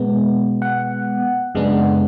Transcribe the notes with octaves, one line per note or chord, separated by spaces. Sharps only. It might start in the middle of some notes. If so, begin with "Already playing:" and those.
Already playing: B2 G#3 B3
F#5
F#2 C#3 G#3 B3 D4